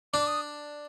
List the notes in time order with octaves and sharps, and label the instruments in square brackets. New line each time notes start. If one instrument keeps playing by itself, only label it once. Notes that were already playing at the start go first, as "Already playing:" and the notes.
[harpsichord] D4 [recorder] D6
[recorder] D#6